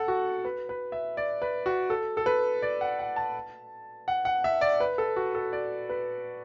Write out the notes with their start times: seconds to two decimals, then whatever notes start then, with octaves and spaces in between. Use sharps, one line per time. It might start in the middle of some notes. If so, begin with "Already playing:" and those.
Already playing: A4 F#5
0.08 F#4
0.45 B4
0.69 B4
0.92 E5
1.17 D5
1.42 B4
1.66 F#4
1.90 A4
2.17 A4
2.26 B4
2.62 D5
2.81 F#5
2.99 F#5
3.16 A5
4.08 F#5
4.25 F#5
4.44 E5
4.61 D5
4.80 B4
4.98 A4
5.16 F#4
5.35 A4
5.53 D5
5.89 B4